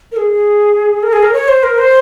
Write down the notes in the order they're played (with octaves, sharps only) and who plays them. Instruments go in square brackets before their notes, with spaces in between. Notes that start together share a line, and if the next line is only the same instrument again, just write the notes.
[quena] A#4
G#4
A#4
G#4
A#4
C#5
C5
A#4
C5